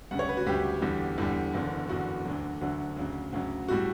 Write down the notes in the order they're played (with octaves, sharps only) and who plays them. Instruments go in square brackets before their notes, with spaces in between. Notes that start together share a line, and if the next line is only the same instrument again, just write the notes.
[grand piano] D2 C#3 G3 F#5
C#5
B4
F#4
D2 C#3 G3 G4
E2 D3 G3
E2 D3 G3
F#1 E2 D3
F#1 E2 D3 F#4
D2 D3 F#3
D2 D3 F#3 F#4
D2 C#3 F#3
D2 C#3 F#3
A2 G3 F#4